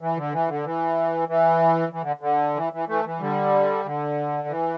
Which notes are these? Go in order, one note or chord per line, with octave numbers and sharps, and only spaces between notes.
E3
D3
E3
D3
E3
E3
E3
D3
D3
E3
E3
E3 A3
E3
D3 G3
D3
E3